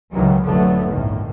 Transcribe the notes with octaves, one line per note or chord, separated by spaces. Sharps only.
C#2 D#3 E3 F#3 G3
F1 A2 D3 F#3 A3 B3
G1 C2 F2 A2 D#3